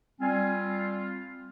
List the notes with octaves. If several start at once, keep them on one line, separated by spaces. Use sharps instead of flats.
G3 C4 F4 G#5